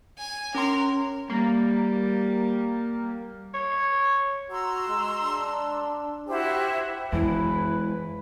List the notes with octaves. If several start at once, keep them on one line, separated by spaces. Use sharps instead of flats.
G#5
C#4 A#4 C6
G3 A#3
C#5
F#4 A#5 C6 E6
G#3
D4
E4 F#4 G4 C5
F#2 E3 G#3 E4 B4